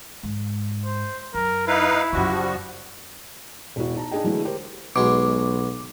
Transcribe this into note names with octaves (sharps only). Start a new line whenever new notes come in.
G#2
C5
F#2 A#4
D#4 E4 B4 F5
F#2 C#3 F3 G3 F#4
E1 E4 F#4
D#4 A5 A#5
D4 D#4 G#4 D#5 G5
D3 E3 F#3 G#3 A3 E4
G4 A#4 C5
B1 B2 G#3 D6